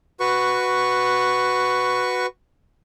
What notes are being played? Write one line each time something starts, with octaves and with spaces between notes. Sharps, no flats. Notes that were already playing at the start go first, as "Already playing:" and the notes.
F#4 B4 C#6